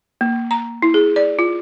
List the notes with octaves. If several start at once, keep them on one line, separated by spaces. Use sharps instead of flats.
A#3
A#5
E4
G#4
D5
F4